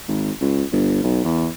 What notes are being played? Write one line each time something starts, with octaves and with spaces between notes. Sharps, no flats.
G#1
C#2
G1
B1
E2